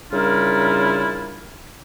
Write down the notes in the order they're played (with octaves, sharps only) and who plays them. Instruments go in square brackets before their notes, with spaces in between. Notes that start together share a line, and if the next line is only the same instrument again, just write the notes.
[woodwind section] C#3 G3 D4 E4 F4 A#4